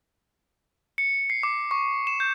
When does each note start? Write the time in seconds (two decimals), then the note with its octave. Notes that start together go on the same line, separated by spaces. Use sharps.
0.98 C#7
1.30 C7
1.43 D6
1.71 C#6
2.07 E7
2.20 G6